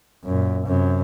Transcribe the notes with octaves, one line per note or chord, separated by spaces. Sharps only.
F#2 A#2
F#2 C3